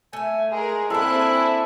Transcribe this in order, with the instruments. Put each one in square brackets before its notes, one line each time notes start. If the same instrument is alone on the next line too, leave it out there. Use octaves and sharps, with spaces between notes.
[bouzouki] A3 E5 [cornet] G#5
[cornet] G#3 [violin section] G#4 A#4
[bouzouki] A#3 D4 [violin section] C4 G#5 F#6 [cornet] E4 [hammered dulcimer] A4